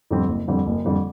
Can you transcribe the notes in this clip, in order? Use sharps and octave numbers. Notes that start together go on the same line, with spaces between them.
F2 D3 G3 C4
F#1
F2 D3 G3 C4
F#1
F2 D3 G3 C4